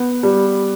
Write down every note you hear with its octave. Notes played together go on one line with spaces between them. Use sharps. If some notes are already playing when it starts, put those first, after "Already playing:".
Already playing: B3
G3